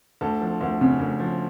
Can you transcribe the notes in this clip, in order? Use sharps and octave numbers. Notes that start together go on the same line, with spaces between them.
D2 A4
F3
D2
C#3
D2
F3